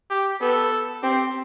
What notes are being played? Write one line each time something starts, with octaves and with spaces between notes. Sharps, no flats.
G4
B3 A4
C4 G4